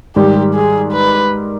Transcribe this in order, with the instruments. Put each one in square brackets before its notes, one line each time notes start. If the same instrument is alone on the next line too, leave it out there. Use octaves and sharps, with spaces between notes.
[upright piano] G#2 D#3 G3 [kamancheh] G4
[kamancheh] G#4
B4